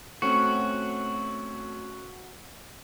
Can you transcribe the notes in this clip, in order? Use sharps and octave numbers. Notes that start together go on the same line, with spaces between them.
A3 C4 C#4 F#4 C#6